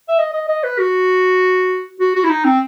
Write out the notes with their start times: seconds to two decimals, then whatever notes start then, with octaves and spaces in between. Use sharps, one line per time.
0.09 E5
0.19 D#5
0.33 D#5
0.49 D#5
0.64 B4
0.79 F#4
2.00 F#4
2.15 F#4
2.24 E4
2.30 D#4
2.45 C4